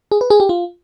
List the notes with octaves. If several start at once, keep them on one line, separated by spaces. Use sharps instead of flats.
G#4
B4
G#4
G4
F4